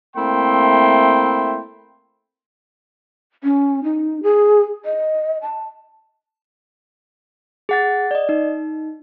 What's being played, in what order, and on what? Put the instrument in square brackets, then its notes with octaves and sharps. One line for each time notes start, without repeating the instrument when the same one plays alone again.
[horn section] A3 A#3 C4 E4 G5 C6
[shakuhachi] C#4
D#4
G#4
D#5
A5
[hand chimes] G#4 F#5 A6
D5 D#5
D#4